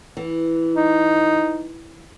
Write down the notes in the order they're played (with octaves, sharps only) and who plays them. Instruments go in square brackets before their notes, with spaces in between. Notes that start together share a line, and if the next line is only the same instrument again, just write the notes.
[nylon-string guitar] E3
[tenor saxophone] D#4